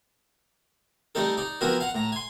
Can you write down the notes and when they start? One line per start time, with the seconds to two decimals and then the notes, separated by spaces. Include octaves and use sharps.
1.15 G3 A3 C4 D#4 A4
1.37 D#4 D5
1.61 F3 B3 C4 E4 F#4 A#4
1.80 F5 F#5
1.95 A2 A#5
2.12 G#5 C6